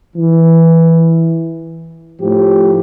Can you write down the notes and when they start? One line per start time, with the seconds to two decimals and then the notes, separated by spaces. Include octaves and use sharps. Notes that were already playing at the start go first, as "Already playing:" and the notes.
0.16 E3
2.21 A2 F3 G4